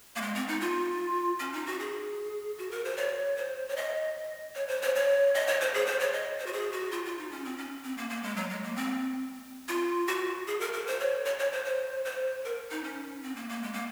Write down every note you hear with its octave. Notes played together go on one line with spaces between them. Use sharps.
A#3
G#3
C4
D#4
F4
C#4
D#4
F#4
G#4
F#4
A#4
C5
C#5
C5
C#5
D#5
C#5
C5
C#5
C#5
D#5
C#5
C5
G#4
C5
C#5
D#5
C5
F#4
G#4
F#4
F4
F4
D#4
C#4
C4
C#4
C4
A#3
A#3
G#3
F#3
G#3
A#3
C4
F4
F#4
G#4
A#4
A#4
C5
C#5
C#5
C#5
C5
C5
C5
A#4
D#4
C#4
C4
A#3
A#3
G#3
A#3